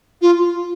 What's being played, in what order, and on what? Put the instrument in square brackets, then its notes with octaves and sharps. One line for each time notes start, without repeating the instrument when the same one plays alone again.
[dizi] F4